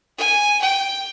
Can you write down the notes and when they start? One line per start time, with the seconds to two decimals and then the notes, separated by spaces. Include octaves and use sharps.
0.18 G#5
0.62 G5